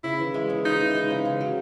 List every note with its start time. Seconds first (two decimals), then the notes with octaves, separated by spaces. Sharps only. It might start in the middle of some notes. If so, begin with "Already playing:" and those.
0.04 C#3 E4
0.19 E3
0.34 G#3
0.50 C#3
0.64 C#3 D#4
0.80 E3
0.95 G#3
1.10 C#3
1.25 C#3
1.41 F#3